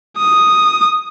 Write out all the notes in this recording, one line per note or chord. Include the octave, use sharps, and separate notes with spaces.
D#6